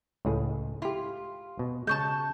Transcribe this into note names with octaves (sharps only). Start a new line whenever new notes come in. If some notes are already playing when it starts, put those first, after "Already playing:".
C#2 A2 G#4
E4 F4 G4
B2
C#3 G#3 A5 C#6 G6